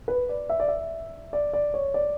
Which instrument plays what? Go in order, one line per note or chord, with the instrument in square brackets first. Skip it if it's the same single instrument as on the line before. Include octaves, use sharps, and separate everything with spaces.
[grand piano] B4
D5
E5
D5
E5
D5
D5
C#5
D5